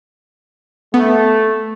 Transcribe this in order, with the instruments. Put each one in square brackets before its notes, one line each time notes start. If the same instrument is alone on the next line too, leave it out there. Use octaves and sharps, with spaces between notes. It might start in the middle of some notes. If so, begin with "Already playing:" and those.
[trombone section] A3 [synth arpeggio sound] B3